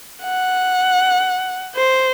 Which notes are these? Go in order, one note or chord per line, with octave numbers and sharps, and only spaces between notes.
F#5
C5